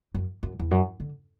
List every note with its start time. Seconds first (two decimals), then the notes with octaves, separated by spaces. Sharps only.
0.14 F#2
0.43 F#2
0.59 E2
0.71 F#2
1.00 D3